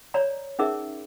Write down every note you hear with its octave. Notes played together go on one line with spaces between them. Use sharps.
C#5 D5 A#5 B5
C#4 D#4 G#4 A#4 E5 D6